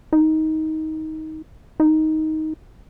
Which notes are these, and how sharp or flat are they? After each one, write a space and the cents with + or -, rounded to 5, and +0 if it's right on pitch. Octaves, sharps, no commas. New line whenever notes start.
D#4 +15
D#4 +10